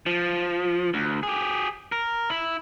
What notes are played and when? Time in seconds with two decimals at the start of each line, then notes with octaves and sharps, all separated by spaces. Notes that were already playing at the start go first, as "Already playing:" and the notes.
0.06 F3
0.94 D2
1.23 G4 G#4
1.92 A#4
2.30 E4